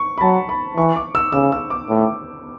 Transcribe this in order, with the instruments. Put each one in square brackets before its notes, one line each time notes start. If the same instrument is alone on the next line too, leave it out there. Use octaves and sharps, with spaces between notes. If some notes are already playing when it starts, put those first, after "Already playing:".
Already playing: [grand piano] C#6
B5
[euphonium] F#3 [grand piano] A5
[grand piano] B5
[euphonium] E3 [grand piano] C#6
[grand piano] D6
E6
[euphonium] C#3 [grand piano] E6
[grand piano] E6
D6
[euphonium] A2